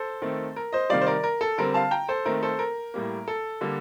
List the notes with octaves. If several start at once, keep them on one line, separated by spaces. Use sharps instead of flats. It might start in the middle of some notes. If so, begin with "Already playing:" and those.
Already playing: A4 C5
D#3 A3 C4
A#4
C5 D#5
C3 D#3 G3 D5 F5
C5
A#4 D5
A#4
A4
D3 G3 C4 A#4
F5 A5
G5 A#5
A4 C5
D#3 A3 C4 A#4
A4 C5
A#4
A2 G3 A#3
A4
D3 G3 A#3